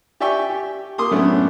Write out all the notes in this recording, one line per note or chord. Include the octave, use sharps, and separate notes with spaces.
G4 D5 E5 G5 G#5 C#6
G4
A#3 C6 D6 D#6
F#2 A2 A3 B3 C#4 D4